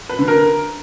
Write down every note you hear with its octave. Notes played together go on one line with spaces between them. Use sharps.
B4
D3
A#4